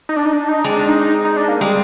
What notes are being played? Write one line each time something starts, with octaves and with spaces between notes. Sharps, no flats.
D#4
D4
D#4
D4
D#4
G#3 C4 D4
D4
D#4
D#4
D#4
D4
A#3
G3 G#3 C4